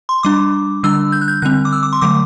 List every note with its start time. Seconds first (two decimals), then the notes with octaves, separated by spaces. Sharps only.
0.09 C6
0.23 G3 D4 D6
0.83 D3 G3 D4 E6
1.12 G6
1.21 F#6
1.28 G6
1.42 D3 G3 C4 F#6
1.65 D6
1.72 E6
1.83 D6
1.93 C6
2.01 D3 F#3 A3 D6